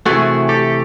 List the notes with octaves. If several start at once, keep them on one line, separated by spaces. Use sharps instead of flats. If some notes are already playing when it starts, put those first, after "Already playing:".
C3 E3 A3 F#4 G#4
G4 A4